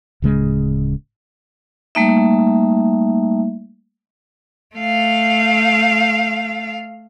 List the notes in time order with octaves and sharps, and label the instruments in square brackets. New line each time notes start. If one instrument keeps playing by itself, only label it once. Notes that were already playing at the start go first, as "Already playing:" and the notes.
[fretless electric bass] D1 C#3 G#3
[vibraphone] G3 A3 A#3 D#4 E5
[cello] A3 F5